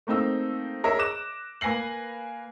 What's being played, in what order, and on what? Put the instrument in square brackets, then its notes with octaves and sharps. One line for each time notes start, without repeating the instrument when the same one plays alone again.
[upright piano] A3 A#3 C4 D#4 E6
G#4 A#4 C#5 D#5 E5
D6 F#6 A#6 E7
A#3 B4 G#5 A#6 C7 F#7